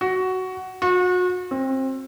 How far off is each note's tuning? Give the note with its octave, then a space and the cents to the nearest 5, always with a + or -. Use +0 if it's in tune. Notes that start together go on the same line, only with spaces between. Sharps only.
F#4 +10
F#4 -35
C4 +25